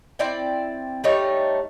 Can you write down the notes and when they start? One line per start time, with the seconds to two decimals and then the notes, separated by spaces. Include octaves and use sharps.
0.19 C4 E4 D5 G5
1.04 G3 A3 D#4 C#5